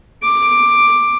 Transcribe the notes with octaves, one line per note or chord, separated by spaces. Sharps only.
D6